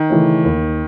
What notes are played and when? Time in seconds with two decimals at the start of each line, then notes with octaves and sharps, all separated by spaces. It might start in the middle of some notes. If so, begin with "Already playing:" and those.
Already playing: D#3
0.10 C#3 E3 A3 C#4
0.44 D#2